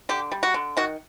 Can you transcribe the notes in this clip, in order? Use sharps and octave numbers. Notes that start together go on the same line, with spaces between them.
D3 G4
G3
F#4
D3
D#3 F#4